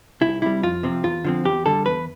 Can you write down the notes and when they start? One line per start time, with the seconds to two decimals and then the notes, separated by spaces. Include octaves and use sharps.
0.21 C2 E4
0.42 C3 G3 E4
0.63 F2 F4
0.83 C3 F3 C4
1.04 E2 F4
1.24 D3 F3 C4
1.45 E2 G4
1.66 D3 G3 A4
1.86 E2 B4